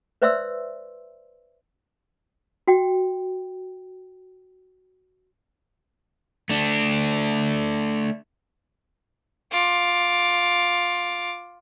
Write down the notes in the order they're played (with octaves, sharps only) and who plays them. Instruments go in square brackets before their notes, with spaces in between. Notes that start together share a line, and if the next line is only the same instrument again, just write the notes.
[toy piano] B4 C5 D5 E5 C6 E6
F#4 G5
[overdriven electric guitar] A3 D4
[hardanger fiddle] F4 D6